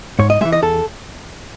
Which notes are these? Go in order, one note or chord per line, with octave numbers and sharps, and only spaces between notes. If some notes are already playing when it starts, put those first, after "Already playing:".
G#2 C#5
D#5
E3 G#3 E5
D#5
E2 A4